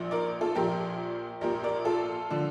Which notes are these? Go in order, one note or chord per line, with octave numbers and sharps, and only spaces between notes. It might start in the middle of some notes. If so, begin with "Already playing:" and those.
Already playing: A#1 A#2 F3
A#4 D5
F4 A4
A#1 A#2 F3 G4 A#4
A#1 A#2 F3 G4 A#4
A#4 D5
F4 A4
D3 F3